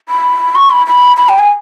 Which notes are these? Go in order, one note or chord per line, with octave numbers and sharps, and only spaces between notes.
B5
C#6
B5
B5
B5
G5
G#5